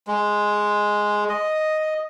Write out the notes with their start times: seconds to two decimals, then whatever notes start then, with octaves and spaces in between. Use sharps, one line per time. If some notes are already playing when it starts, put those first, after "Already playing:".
0.07 G#3
1.29 D#5